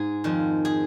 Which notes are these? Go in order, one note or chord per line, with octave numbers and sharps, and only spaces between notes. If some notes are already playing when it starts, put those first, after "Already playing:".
Already playing: G#2 G#4
F2 D#3
G#4